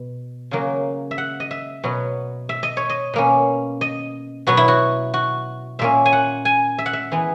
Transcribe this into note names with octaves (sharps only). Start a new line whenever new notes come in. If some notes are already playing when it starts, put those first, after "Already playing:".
Already playing: B2
C#3 F#3 A#3
E5
F#5
D#5
E5
B2 F#3 B3
E5
D#5
C#5
D#5
B2 A#3 C#4
D#5
B2 F#3 B3 F#4
E4
F#4
F#4
A#2 A#3 C#4 E5
G#5
F#5
G#5
E5
F#5
E5
E3 G#3 B3